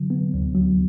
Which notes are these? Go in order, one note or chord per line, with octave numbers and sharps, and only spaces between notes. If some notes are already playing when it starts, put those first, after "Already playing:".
Already playing: D3 F#3
B3
D2
F#3